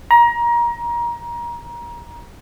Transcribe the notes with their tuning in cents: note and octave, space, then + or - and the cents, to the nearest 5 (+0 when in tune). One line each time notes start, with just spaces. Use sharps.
A#5 +25